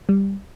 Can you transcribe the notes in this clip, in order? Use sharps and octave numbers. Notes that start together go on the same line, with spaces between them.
G3